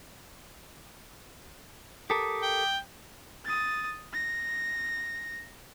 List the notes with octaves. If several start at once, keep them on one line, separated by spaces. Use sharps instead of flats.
G4 A4 A#4 D6 D#6 B6
G5
D#6 A6
A#6